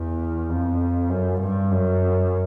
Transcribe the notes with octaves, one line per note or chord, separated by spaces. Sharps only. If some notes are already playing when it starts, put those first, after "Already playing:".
Already playing: E2
F2
F#2
G2
F#2